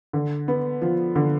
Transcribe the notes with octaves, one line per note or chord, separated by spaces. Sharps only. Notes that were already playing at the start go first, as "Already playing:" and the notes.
D3
B3
F3
D3